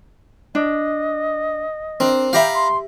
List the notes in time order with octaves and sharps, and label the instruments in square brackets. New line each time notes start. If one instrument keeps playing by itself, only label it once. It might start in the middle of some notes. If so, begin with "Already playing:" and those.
[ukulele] D4 [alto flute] D#5
[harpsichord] C4 [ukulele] D4 A#4
[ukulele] G4 E5 [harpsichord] F5 A#5 B5 [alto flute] G5
[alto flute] C6